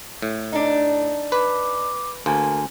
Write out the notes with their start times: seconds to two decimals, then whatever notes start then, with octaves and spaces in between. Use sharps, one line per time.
0.22 A2
0.52 D4 D#4
1.32 B4 D6
2.26 D2 A#3 G#5